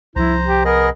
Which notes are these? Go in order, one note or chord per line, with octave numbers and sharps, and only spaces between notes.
C2 F3 E4 C5 A#5
G4
B3 G#4 A#4 D#5